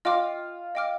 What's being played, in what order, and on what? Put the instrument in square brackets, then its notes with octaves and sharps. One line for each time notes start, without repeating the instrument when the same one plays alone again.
[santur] F4 [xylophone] D#5 G5 D6 F6
[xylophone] D#5 G5 D6 F6